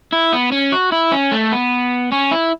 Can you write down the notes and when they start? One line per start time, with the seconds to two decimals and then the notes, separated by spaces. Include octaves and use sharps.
0.13 E4
0.33 B3
0.52 C#4
0.72 F#4
0.92 E4
1.12 C#4
1.31 A3
1.52 B3
2.12 C#4
2.31 E4